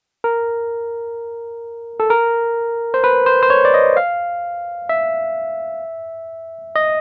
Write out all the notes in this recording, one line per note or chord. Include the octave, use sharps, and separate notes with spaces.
A#4
A4
A#4
C5
B4
C5
C5
C#5
D5
D#5
F5
E5
D#5